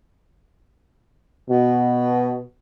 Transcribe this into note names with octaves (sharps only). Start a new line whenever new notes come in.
B2